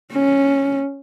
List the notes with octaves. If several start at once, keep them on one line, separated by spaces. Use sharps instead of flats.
C#4